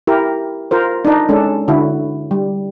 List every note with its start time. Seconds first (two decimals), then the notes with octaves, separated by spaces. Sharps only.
0.07 E4 G4 A#4
0.71 F4 A#4 C5
1.05 D4 D#4
1.29 G#3 C#4 D4 A4
1.68 D3 E4 F#4
2.31 G3